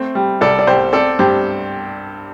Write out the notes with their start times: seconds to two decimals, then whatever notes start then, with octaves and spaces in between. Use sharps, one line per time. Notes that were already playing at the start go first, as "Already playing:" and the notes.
Already playing: A3 C4
0.15 G3
0.41 C2 A4 D5
0.59 D5
0.67 C2 G4 C5
0.93 C4 A4 D5
1.19 G2 G4 C5